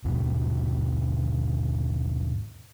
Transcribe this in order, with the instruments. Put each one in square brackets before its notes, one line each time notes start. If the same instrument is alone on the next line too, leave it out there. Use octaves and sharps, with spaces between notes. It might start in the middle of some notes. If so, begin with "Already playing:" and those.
[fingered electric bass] D#2 G#2 B2 F3